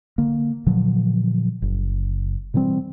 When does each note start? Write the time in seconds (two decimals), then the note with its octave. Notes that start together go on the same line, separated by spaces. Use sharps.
0.18 D3 A#3
0.66 A#2 D3 F3 F#3
1.62 F#1
2.54 B2 E3 G3 C4